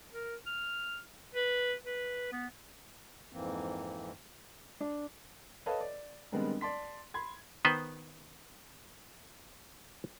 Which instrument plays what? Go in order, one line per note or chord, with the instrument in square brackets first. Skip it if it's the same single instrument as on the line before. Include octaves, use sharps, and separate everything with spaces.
[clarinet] A#4
F6
B4
B4
B3
[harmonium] F2 G#2 E3 A#3 C4
[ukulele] D4
[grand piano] A4 B4 C#5 D#5 F5 A5
D5
D#3 G3 G#3 B3 C4 D4
D5 A5 C6 B6
B5 C6 G#6
[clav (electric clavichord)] D#3 B3 B4 C5